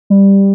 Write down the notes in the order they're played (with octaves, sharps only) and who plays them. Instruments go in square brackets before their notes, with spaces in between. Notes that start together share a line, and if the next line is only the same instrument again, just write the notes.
[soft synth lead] G3